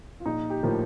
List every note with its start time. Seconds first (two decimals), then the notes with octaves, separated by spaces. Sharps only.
0.20 F4
0.25 A#1 D#4
0.50 G4
0.63 A2 F3 A#3